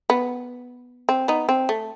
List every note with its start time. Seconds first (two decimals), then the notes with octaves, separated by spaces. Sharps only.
0.10 B3
1.09 C4
1.28 B3 D#4
1.49 C4
1.69 A3